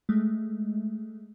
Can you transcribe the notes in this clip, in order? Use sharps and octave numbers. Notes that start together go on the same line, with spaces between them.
G#3 A3